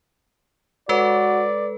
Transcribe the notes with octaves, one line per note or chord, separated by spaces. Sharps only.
G#3 F#4 A4 B4 D5